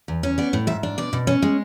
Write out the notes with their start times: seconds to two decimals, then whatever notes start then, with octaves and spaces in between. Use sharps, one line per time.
0.08 E2
0.23 C#4
0.38 B3 D5
0.53 A2
0.67 G#2 E5
0.83 D4
0.98 B2 D5
1.13 B2
1.27 C#4
1.42 G#3